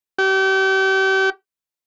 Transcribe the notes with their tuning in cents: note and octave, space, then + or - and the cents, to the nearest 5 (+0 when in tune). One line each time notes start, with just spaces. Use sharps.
G4 -35